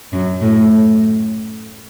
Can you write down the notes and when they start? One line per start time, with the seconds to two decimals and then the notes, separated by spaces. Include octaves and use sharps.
0.13 F#2
0.41 A2